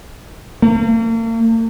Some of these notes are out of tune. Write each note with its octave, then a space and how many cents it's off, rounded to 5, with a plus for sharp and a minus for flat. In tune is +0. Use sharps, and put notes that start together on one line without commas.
A#3 -45